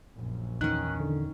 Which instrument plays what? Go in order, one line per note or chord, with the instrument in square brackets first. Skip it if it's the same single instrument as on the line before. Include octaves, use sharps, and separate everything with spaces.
[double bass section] A#1 F#2
[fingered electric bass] E2 [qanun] D#3 C#4 [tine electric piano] F#6
[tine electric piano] D3